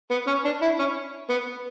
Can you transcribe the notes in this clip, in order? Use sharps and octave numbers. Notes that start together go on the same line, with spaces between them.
B3
C#4
D4
E4
C#4
B3